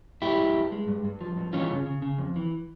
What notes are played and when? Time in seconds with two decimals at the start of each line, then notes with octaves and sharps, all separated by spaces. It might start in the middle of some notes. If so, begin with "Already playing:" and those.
0.22 G2 E4 G4
0.39 G2
0.55 G2
0.72 G#3
0.88 G2
1.05 G2
1.21 F3
1.37 G2
1.53 E3 C#4 F4
1.69 C#3
1.86 C#3
2.02 C#3
2.18 F2
2.36 E3